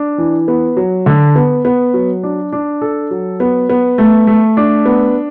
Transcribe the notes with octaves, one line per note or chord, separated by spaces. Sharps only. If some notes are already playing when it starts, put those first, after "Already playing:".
Already playing: D4
E3
B3
F#3
D3
B3
B3
F#3
D4
D4
A4
F#3
B3
B3
A3
A3
D4
B3